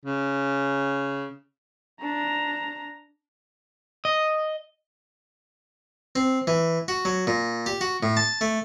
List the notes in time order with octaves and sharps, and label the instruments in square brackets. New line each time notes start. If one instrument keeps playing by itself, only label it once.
[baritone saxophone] C#3
[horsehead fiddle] D4 A#5
[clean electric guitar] D#5
[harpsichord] C4
E3
F#4
F#3
A#2
G4
F#4
A2
A5
A3